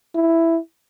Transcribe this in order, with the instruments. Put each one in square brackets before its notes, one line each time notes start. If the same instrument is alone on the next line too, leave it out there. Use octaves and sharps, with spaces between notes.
[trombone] E4